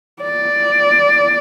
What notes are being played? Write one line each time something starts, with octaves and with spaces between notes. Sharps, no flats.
D5